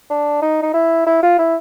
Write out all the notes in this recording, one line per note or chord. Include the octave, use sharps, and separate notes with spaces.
D4
D#4
D#4
E4
E4
F4
E4